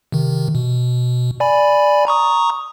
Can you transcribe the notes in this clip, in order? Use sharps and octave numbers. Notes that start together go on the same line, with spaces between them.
C3 D#3
B2
D5 G#5 B5
A#5 C#6 D#6